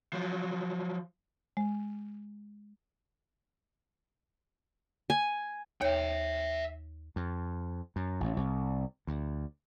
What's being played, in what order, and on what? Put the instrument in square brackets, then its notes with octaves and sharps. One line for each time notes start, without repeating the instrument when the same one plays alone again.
[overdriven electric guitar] F3 F#3
[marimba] G#3
[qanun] G#5
[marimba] D#2 C#5 G6 [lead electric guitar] E5 G5
[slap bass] F2
F#2
A1
C2
D2